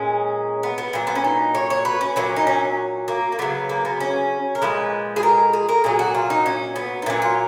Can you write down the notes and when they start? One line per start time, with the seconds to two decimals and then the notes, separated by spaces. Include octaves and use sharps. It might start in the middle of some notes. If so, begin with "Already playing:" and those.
Already playing: A#2 G#3 C#4
0.63 B3
0.78 B3
0.93 A#2 F#3
1.07 B3
1.15 C#4
1.24 D#4
1.55 C#5
1.70 C#5
1.85 B4
2.01 C#4
2.16 A#2 F#3 C#4
2.36 D#4
2.47 C#4
3.08 A#3
3.32 A#3
3.39 C#3 F#3 B3
3.69 A#3
3.85 B3
4.00 C#4
4.55 A#4
4.62 A#2 F3 G#3 B4
5.16 G#4
5.23 A#4
5.53 G#4
5.69 A#4
5.84 A#2 F#3 G#4
5.99 F#4
6.15 F4
6.30 D#4
6.46 C#4
6.76 B3
7.02 D#4
7.06 A#2 F#3 C#4
7.22 F4